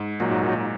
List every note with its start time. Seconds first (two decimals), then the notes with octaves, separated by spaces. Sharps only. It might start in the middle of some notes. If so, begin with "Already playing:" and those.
Already playing: G#2
0.20 A#2 F#3 D#4 F#4
0.31 G#2
0.43 A#2